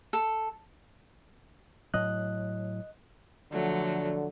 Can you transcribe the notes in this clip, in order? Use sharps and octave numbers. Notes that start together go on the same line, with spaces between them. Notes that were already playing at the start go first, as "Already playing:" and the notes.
A4
A2 F#3 D#5 F#6
D3 F3 F#3 A3